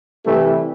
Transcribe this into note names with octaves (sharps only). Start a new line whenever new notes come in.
C3 E3 G3 A3